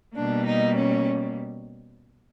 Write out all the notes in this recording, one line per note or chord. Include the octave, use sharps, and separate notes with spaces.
B2 G3 A#3 D4
D#4
C#4